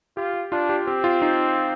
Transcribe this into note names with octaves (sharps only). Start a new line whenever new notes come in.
F4 G4
D4 F4
G4
C4 G4
F4
D#4